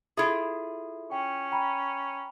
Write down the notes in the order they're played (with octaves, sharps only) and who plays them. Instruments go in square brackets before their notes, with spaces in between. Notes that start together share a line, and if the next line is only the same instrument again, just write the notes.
[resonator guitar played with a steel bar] E4 F4 G#4 [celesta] A4 E5
[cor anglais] C#4 [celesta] G5
[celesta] G5 A#5 B5